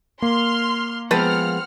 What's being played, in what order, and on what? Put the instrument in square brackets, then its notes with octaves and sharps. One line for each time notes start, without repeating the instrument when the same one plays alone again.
[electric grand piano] A#3 [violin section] C6 F6
[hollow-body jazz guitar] F3 G#3 B3 [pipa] C4 B4 A5 [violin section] F#5 F6